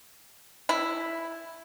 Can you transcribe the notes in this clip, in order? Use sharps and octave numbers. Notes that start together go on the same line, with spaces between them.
E4